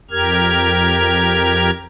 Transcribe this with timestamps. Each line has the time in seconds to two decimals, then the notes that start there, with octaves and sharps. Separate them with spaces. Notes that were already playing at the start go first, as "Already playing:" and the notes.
0.11 F2 G4 A#4 F6 G#6